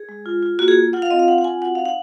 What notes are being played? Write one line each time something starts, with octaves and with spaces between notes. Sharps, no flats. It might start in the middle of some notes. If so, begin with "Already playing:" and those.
Already playing: G#4
G#3
F4
F4
A#3 F#4
G#4
F4
F4 F#5
F5
C4 D#5
F5
F4 F#5
F#5
C4 G#5
F#4 F#5
D#4 F5
F#5